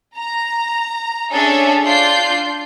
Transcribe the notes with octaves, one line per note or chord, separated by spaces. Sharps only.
A#5
C#4 D4 G#4 A4 E5
D4 F4 G6 C7